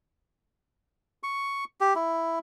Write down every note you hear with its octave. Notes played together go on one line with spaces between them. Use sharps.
C#6
G4
E4